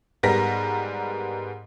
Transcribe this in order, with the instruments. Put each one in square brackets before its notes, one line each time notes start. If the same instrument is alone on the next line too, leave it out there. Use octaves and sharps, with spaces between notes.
[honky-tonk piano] G#2 G3 B3 A#4 A#6 B6